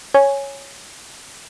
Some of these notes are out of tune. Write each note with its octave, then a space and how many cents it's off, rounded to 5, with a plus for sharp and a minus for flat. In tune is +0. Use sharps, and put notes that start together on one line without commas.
C#5 +0 G#5 +0